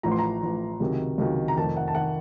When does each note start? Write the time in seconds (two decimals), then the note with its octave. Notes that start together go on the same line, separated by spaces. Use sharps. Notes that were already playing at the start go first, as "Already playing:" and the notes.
0.03 A1 A2 F3 A#5
0.11 C6
0.19 A#5
0.42 A1 A2 F3
0.80 C#2 C3 D#3 F#3
1.18 C#2 C3 D#3 F#3
1.48 A#5
1.57 F1 F2 D#3 A5
1.77 F#5
1.88 A5
1.95 D#3 F#5